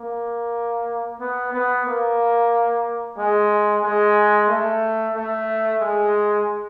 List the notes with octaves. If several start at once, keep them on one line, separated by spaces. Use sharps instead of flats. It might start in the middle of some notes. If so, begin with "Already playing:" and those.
Already playing: A#3
B3
B3
A#3
G#3
G#3
A3
A3
G#3